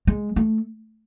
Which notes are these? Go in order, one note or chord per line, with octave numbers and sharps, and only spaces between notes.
G#3
A3